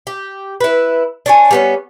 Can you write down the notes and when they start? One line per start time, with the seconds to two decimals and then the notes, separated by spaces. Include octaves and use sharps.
0.07 G4
0.60 E4 B4
1.26 D4 C#5 G#5
1.51 G3 B3 C#4